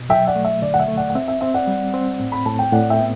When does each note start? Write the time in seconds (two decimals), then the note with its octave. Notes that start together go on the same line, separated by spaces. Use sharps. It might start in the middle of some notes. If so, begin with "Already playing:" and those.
Already playing: B2
0.09 F#3 E5 G5
0.27 D5 F#5
0.35 A3
0.45 E5
0.62 D3 D5
0.74 F#5
0.79 E5
0.88 A3
0.97 D5 F#5
1.10 F#5
1.15 C4 E5
1.28 E5
1.41 C4 E5
1.54 D5 F#5
1.67 G3
1.94 C4
2.20 A2
2.32 B5
2.46 A2 A5
2.59 G5
2.73 A2 D5 F#5
2.90 E5 G5
2.99 B3